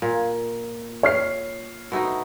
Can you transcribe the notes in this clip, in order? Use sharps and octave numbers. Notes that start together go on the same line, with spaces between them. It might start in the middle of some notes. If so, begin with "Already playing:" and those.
A#2
C#5 F6 C7
B2 A3 D#4